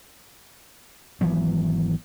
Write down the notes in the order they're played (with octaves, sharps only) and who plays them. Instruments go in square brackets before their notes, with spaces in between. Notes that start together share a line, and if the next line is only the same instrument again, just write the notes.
[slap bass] G#1 E3 F#3 B3